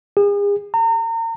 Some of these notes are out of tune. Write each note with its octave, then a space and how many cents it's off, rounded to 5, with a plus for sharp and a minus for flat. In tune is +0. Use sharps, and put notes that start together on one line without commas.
G#4 -40
A#5 -35